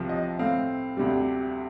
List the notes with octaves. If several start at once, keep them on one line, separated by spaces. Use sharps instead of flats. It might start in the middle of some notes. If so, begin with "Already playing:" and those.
Already playing: C2 C3 F3
D#5
A2 A3 C4 F5
D2 C3 G3